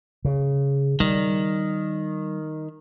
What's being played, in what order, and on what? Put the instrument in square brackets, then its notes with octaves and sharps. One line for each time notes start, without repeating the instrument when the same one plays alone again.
[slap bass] C#3
[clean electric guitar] D#3 [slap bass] G3